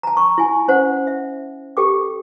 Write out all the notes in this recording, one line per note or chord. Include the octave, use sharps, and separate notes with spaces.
A5 A#5
C#6
E4 G#5
C#4 C5 F#5
E5
G4 A4 G5 D6